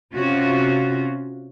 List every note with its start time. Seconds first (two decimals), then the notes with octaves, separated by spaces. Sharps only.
0.14 C3 C#4 F4 F#4